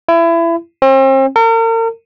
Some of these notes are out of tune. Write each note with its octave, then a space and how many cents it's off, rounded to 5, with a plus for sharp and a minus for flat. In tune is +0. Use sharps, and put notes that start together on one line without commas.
E4 +25
C4 +40
A#4 -40